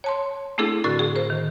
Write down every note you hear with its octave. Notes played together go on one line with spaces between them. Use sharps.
C#5 A5 C6
A3 C4 D4 E4 G#4 A4
A2 D3 F#4 A#4 A6
G#4
A#4 C5
D#3